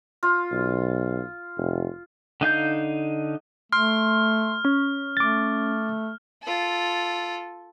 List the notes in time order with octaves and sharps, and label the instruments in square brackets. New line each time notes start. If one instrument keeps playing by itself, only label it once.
[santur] F4
[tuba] B1
F1
[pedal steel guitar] D3 D#4 F5 G6
[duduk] A3 [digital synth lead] C6 [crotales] F6
[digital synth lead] C#4
[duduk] A3 [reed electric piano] D6 A6
[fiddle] F4 A4